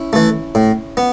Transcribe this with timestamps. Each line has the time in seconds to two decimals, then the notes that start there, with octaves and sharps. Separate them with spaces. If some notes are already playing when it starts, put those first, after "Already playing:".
Already playing: C#4 E4
0.13 E3 A3
0.55 A2
0.97 B3